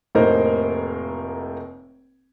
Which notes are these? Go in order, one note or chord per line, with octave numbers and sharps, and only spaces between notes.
F1 A2 A#3 D#4 A#4 C5